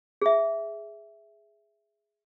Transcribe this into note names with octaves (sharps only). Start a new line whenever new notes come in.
G#4 E5